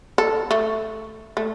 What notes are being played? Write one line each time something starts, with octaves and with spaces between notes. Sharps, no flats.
A4
A3
A3